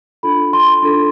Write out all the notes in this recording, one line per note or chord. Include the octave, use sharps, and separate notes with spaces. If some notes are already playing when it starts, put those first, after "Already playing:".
D4 F4 A4 B5
C6
D4 F4 A4